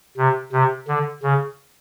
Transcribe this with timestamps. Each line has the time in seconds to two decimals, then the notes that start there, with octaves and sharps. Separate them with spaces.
0.17 C3
0.53 C3
0.88 D3
1.23 C#3